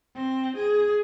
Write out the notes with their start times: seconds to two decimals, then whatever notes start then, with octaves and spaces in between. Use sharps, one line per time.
0.15 C4
0.56 G#4